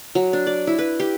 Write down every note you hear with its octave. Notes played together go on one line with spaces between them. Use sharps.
F#3
D4
D5
E4
B4
G4